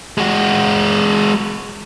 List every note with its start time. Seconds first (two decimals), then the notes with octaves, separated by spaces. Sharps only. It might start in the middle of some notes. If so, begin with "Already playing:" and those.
0.18 G#3 F#4